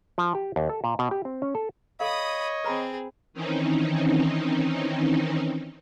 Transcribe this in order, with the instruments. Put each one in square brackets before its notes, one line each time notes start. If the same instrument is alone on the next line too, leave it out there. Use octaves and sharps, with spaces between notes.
[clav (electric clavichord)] F3
G4
D#2
A4
A#2
B2
G4
C4
C#4
A4
[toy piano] A4 F5 [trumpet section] C#5 D#5 [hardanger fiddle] B5 D#6
[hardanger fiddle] C4 G#4 [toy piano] B4 A#5 B5
[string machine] D#3 E3 C4 C#4 D#4